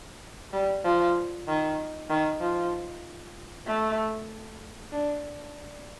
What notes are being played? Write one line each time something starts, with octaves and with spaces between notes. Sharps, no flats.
G3
F3
D#3
D#3
F3
A3
D4